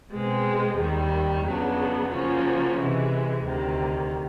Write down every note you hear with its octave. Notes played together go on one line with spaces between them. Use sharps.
B2 G#3 C4
D#2 D#3 G3
F2 C#3 F#3 B3 D4
C#3 F3 A#3 C#4 F#4
C3 E3 G#3
D2 C3 D#3